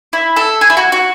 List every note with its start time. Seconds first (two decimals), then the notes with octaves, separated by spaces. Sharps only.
0.13 E4
0.36 A4
0.61 G#4
0.70 E4
0.77 F#4
0.92 F#4